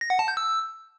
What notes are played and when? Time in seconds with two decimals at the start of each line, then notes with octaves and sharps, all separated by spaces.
0.01 A#6
0.10 F#5
0.19 A5
0.28 G6
0.37 E6